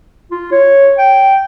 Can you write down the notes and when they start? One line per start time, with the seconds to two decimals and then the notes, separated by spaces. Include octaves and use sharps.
0.31 F4
0.52 C#5
0.99 G5